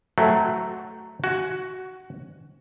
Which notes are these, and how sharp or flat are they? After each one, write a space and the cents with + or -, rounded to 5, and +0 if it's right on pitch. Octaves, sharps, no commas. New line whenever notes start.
F#3 +0 A3 +0 C4 +0
F#4 +10 G#5 +15